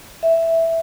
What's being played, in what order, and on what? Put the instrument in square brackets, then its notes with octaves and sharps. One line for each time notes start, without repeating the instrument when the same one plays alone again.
[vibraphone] E5